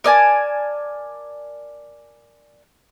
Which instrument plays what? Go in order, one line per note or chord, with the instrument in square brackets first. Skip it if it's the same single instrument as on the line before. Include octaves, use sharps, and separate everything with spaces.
[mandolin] A#4 D5 G#5 A5